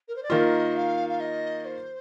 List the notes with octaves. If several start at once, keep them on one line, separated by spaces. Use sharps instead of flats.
A#4
C5
D5
D#3 A#3 F4 D#5
F5
F5
D#5
C5